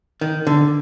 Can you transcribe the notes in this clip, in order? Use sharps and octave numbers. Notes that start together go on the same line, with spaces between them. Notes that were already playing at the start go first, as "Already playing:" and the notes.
D#3
D3